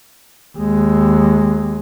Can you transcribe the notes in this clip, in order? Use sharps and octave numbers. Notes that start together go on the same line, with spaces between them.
D#2 G#3